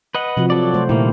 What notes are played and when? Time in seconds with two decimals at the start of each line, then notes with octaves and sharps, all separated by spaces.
0.15 B4 D#5 F#5
0.37 C3 F3 F#4
0.50 F#3 A4 D5
0.74 A3 C5
0.89 A#2 D#3 G3 A#3 E4